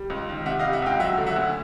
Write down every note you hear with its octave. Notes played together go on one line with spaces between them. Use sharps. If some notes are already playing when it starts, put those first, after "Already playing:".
Already playing: G3
C#2
D#3
C3 E5 F#5
D#5 F5
G3
E5 F#5
C#2 F5 G5
F#3 E5 F#5
D3
E5 F#5
D2